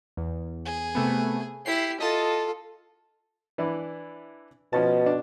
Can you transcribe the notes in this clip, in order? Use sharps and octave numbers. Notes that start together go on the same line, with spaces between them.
E2
G#4
C3 A3 B3
E4 G4 C7
F4 A4 D#5 A5
E3 D4 E4
B2 F3 C#4 A5
D4